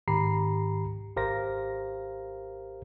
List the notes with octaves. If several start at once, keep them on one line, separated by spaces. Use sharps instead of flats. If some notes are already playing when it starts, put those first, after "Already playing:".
G#2 D#3 G4 A#5 B5 C7
G#1 G4 A#4 C5 F5 A#6